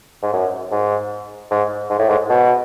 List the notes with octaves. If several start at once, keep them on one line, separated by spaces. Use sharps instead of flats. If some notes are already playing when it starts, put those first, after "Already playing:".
G#2
F#2
G#2
G#2
G#2
A2
G#2
B2